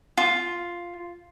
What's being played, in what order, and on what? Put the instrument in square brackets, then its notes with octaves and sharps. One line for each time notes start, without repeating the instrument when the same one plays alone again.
[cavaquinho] F4